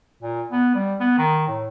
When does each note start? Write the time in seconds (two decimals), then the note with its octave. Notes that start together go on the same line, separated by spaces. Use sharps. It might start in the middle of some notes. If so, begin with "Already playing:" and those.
0.23 A#2
0.51 B3
0.75 G3
1.00 B3
1.18 D#3
1.47 A2